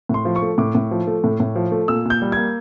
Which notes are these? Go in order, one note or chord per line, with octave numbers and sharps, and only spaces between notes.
A2 C6
F3
C#6
A3
A2 D6
A2
F3
A3
A2
A2
F3
A3
A#2 E6
A#2 G6
G3
A#3 G#6